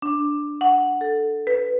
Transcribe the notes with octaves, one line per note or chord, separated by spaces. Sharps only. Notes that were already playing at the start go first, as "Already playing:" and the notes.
D4
F#5
A4
B4